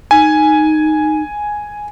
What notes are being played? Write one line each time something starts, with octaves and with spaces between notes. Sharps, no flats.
D#4 G#5